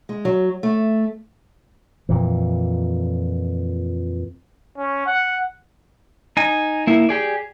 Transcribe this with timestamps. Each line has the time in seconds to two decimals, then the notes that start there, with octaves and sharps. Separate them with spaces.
0.09 G#3
0.25 F#3
0.63 A3
2.09 F2 A#2 E3
4.78 C#4
5.07 F#5
6.37 D#4 G#5
6.87 A#3 E4
7.09 G4 G#4 D5